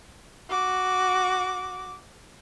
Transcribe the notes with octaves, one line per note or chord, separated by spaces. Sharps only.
F#4 D6